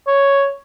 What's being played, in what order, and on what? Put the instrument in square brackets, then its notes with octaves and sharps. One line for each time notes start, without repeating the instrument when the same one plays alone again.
[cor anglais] C#5